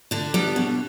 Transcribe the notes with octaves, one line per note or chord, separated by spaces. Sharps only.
D3 D4
G3 B3
B2